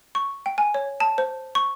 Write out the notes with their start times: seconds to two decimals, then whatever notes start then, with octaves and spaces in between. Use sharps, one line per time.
0.15 C#6
0.46 G5
0.58 G#5
0.74 C#5
1.00 A5
1.18 C5
1.55 C#6